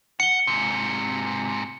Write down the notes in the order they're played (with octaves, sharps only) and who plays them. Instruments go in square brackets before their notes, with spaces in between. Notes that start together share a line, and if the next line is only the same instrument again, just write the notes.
[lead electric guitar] F#5 [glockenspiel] C#7 G7
[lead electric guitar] G#2 C3